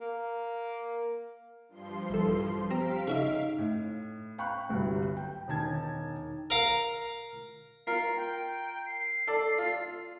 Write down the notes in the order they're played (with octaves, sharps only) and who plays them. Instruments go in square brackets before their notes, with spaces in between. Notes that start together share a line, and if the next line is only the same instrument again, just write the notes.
[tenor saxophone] A#3
[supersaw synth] G2 F3 C6
[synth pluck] A#1 E3 A4
[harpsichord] C4 [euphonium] G4 [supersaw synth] F5 B6 D7 [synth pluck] A#5
[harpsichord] C#3 F#4 E5 [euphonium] D#4 [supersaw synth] F5
[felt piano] A2
F5 G5 B5 C#6 F#6
G1 C2 G2 F#3
G5
E1 D#3 A5 G#6
[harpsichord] A#4 F5
[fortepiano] F4 A#4 [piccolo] C7
[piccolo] G5
C7
[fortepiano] A4 D5
F4